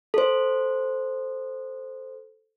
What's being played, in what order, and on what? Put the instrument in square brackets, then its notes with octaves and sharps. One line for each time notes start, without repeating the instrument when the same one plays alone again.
[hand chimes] A4 C5